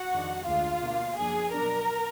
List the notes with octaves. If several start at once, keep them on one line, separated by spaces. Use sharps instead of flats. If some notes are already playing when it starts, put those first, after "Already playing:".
Already playing: F#4 F#5
F2 D#3 G#3 D4
D2 D3 G#3 D4 F4 F5
B2 A#3 D4
F#2 F3 A#3 D4 G#4 G#5
B2 F#3 D4 A#4 A#5